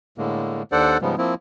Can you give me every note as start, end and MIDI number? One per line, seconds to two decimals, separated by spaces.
0.18 0.63 45
0.18 0.63 50
0.18 0.63 56
0.18 0.63 58
0.72 0.98 39
0.72 0.98 62
0.72 0.98 69
0.72 0.98 72
0.72 0.98 74
0.72 0.98 78
1.02 1.16 44
1.02 1.16 49
1.02 1.16 53
1.02 1.16 55
1.02 1.16 56
1.02 1.16 59
1.18 1.35 53
1.18 1.35 58
1.18 1.35 60
1.18 1.35 64